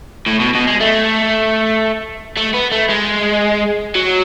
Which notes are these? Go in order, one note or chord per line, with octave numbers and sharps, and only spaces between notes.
A2
B2
B2
G#3
A3
A3
B3
A3
G#3
F#3